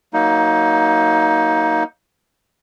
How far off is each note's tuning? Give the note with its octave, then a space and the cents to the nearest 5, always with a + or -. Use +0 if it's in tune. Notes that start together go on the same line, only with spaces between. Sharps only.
F#3 +5 A#3 +0 D#4 +20